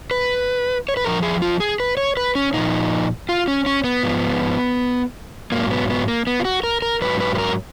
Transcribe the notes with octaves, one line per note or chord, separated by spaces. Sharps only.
B4
C#5
B4
F2 F3 A#4
G#4
F4
G#4
B4
C#5
B4
C#4
A#2 F3 D#4
F4
C#4
C#4
B3
G#2 F3
G#2 F#3 A#3
B3
B3
A#3
B3
F4
F#4
A#4
A#4
G#2 F#3 B4
B4
B4
A#4